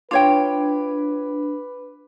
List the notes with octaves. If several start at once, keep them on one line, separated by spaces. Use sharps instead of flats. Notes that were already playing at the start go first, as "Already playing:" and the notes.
D4 F4 B4 C#5 G5